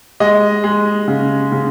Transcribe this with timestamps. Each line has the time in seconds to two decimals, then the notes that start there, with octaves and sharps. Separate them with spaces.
0.20 G#3 D#5
0.64 G#3
1.08 C#3
1.52 C#3